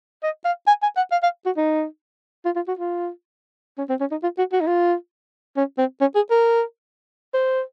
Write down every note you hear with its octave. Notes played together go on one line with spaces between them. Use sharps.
D#5
F5
G#5
G#5
F#5
F5
F5
F#4
D#4
F4
F4
F#4
F4
C#4
C4
C#4
D#4
F4
F#4
F#4
D#4
F4
C#4
C4
C#4
G#4
A#4
C5